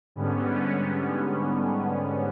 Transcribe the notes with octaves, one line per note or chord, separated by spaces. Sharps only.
G#2 D3 G3 B3 C#4